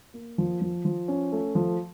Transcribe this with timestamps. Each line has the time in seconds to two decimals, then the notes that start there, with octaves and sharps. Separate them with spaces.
0.14 A#3
0.38 F3
0.61 F3
0.85 F3
1.08 C#4
1.32 A3
1.55 F3